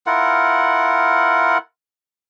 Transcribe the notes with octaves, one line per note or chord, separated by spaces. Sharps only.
E4 F4 A#4 F#5